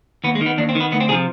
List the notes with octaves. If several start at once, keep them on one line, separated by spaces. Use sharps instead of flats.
D#2 B3
G#3
D#3
B3
D#2 D4
C4
D#3
B3
D2 B3
C4
C3 F3 G#4